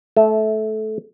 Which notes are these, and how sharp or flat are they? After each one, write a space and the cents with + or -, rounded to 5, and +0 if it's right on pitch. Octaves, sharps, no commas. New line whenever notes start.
A3 -20 E5 +0